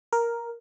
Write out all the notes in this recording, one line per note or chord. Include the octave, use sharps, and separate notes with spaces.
A#4